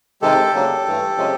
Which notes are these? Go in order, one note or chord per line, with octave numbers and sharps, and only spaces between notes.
C3 D#3 G#3 G4 A4
C#3 F#3 A#3 D4
G2 E3 A3
C3 F3 G#3 C#4